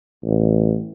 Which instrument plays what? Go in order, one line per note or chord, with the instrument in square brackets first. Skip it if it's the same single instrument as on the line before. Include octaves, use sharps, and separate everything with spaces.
[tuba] A1